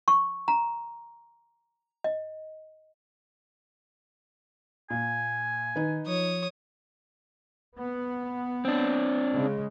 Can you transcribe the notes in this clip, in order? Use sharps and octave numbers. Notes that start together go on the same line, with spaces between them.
C#6
A#5
D#5
A#2 G#5
D#3 D#4 B4
F3 C#5 D#6
B3
C4 D4
C#3 G#3